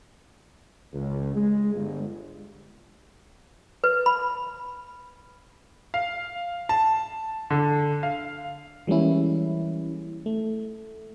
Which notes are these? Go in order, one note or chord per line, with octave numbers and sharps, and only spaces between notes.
C#2
G#3
G1
B4
B5
F5
A5
D3
F5
E3 G3 G#3 A#3 C#4 E4
A3